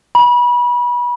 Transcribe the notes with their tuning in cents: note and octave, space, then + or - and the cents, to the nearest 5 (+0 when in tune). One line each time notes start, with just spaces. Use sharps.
B5 -30